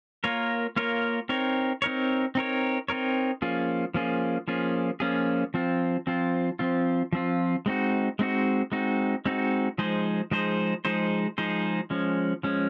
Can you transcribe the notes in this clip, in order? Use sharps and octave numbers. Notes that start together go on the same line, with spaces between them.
A#3 F4 A#4 C#5
A#3 F4 A#4 C#5
C4 D#4 A#4 C#5
C4 D#4 A#4 C#5
C4 D#4 A#4 C#5
C4 D#4 A#4 C#5
F3 A#3 C#4 F4 G#4
F3 A#3 C#4 F4 G#4
F3 A#3 C#4 F4 G#4
F3 A#3 C#4 F4 G#4
F3 C4 F4
F3 C4 F4
F3 C4 F4
F3 C4 F4
G#3 C4 D#4 F#4
G#3 C4 D#4 F#4
G#3 C4 D#4 F#4
G#3 C4 D#4 F#4
F3 G#3 D#4 G#4 C5
F3 G#3 D#4 G#4 C5
F3 G#3 D#4 G#4 C5
F3 G#3 D#4 G#4 C5
F3 G#3 C#4
F3 G#3 C#4